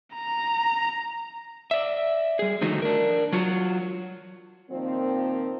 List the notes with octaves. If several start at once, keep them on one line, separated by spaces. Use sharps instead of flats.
A#5
D5 E5
G3 G#4
D3 D#3 F3 A3 D#4 F#4
D4 A#4
F#3 F4 F#4
A#2 D#3 F3 C4